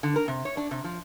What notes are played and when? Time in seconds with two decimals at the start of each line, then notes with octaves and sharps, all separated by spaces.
0.03 D3
0.16 A#4
0.28 C3
0.45 C#5
0.57 D4
0.71 C3
0.84 F3